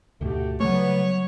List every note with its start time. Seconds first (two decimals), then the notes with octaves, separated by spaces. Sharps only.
0.21 D2 G#2 B2 A3 F#4 G4
0.60 C#3 F#3 G3 A3 B3 C#5 D5